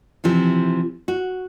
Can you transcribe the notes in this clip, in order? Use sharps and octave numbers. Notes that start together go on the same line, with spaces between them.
C3 E3 F3
F#4